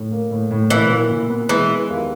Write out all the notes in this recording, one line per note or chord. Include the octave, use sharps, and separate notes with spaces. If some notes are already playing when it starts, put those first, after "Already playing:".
Already playing: A2
A#3
A2
A2
A#2 E3
A#2
A#2
B3
E3 G#3
B3
D#2